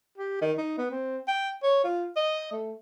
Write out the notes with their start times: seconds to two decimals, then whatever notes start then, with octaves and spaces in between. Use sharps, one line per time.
0.18 G4
0.42 D#3
0.58 D#4
0.78 B3
0.91 C4
1.28 G5
1.63 C#5
1.84 F4
2.16 D#5
2.52 A3